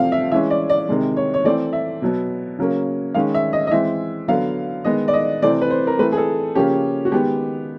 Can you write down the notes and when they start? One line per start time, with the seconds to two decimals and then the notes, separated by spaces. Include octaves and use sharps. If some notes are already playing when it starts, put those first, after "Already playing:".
Already playing: C3 F3 A3 C4 F5
0.12 E5
0.32 E3 G#3 C#4 E5
0.50 D5
0.70 D5
0.89 C3 D#3 G#3
1.17 C#5
1.34 C#5
1.44 E3 A3 C4 D5
1.73 E5
2.02 B2 F#3 B3
2.59 C#3 F#3 A#3 C#4
3.14 D#3 G#3 C#4 F5
3.34 E5
3.53 D#5
3.67 D#5
3.71 E3 G#3 C4 E5
4.28 D3 F#3 B3 F5
4.85 D#3 G#3 B3 D#5
5.08 D5
5.13 D#5
5.42 C3 E3 A3 C4 D5
5.61 B4
5.70 C5
5.87 A#4
5.99 E3 A3 C4 B4
6.12 G#4
6.17 A4
6.55 C#3 F3 A#3 C#4 G4
7.05 F#4
7.12 D#3 G#3 B3 G4